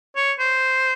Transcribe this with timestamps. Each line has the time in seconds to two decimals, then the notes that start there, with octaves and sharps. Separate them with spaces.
0.16 C#5
0.39 C5